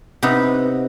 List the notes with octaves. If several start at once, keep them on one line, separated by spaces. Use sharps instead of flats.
C3 B3 D#4